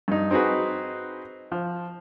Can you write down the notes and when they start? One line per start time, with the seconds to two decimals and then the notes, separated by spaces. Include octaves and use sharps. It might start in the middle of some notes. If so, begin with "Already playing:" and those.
0.08 G2 D#4
0.31 C4 D#4 F#4 G#4 B4
1.52 F3